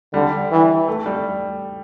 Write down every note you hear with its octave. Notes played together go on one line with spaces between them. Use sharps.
D3 G3
E3
A3
G3